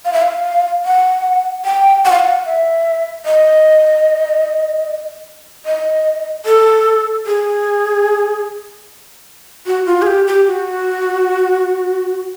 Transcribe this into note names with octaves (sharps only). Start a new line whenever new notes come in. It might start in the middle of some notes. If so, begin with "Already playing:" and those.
F5
E5
F5
F#5
G5
F#5
F5
F#5
E5
D#5
D#5
A4
G#4
F#4
F4
G#4
G4
G4
F#4